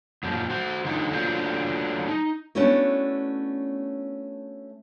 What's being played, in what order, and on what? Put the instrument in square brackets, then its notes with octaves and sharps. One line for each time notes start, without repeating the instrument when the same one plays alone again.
[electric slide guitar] F#2 A#2 F3
F#4 C5
D3 F3 F#3 A3 B3 D#4
F#3 A3 A#3 D4 F4 C5
D#4
[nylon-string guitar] A3 B3 C#4 D4 E4 F#4